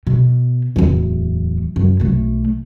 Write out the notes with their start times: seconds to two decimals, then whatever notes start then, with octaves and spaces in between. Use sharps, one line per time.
0.07 B2
0.76 D1 E2
1.76 F#2
2.00 B1 A3